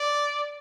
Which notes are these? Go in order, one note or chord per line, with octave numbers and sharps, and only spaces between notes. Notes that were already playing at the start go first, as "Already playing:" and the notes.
Already playing: D5